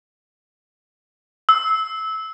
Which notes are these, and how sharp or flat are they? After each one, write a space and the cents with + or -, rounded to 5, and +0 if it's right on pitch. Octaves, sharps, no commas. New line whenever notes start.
E6 -20